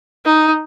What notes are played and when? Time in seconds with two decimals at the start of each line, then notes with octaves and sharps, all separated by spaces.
0.26 D#4